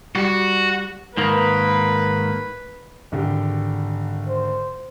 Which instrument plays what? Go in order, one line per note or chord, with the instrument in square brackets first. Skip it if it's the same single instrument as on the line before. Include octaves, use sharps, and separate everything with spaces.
[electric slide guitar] G3 [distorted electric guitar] F#4
[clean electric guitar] G#2 D#3 A#3 [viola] B4
[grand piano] G#1 D3 G4
[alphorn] C5